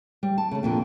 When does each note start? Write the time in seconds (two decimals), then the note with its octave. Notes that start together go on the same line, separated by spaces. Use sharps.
0.23 G3
0.38 A5
0.51 C#3 A3
0.63 F2 A#2 D3